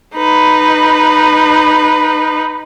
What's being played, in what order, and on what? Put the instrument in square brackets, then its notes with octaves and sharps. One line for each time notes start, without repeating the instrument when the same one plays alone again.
[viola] D#4 B4